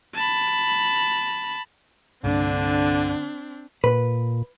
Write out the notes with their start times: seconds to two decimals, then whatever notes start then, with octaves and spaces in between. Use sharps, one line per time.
0.15 A5 B5
2.24 C2 G2 D3 A#3 C4 D4
3.84 A#2 B4